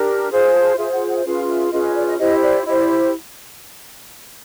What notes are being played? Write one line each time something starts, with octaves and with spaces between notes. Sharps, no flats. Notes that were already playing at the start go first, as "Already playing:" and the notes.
Already playing: D4 G4 A#4
F4 G#4 C5
A5
F4 G#4 C5 E5
F#5
F#5
E5
C#4 F4 G#4 B4 F5
E5
C#4 F4 G#4 B4 D#5
D#5
D5
D#5
E4 G4 C5 D#5
D5
E4 G4 C5 D#5
D5